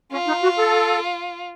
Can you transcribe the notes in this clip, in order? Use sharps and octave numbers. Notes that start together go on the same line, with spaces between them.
C#4 F4
D#4
F#4
A4